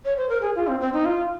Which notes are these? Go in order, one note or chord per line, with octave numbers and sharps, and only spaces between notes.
C#5
C5
A#4
G#4
F4
C4
C4
D#4
F4